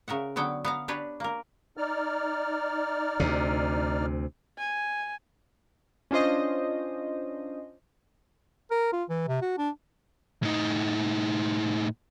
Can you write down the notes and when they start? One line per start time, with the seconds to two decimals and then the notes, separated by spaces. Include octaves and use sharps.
0.08 C#3 A#4 E5 F#5
0.36 D3 F#3 B3 F#5 G5
0.65 B3 F5 A#5
0.88 D4 G4 B4 C#5
1.20 A#3 A#4
1.77 D#4 D5 F6
3.20 D2 C3
4.58 G#5
6.11 C#4 D4 F4 C5 D#5
8.71 A#4
8.93 F4
9.10 E3
9.28 C3
9.42 F#4
9.58 D4
10.43 A2 D#4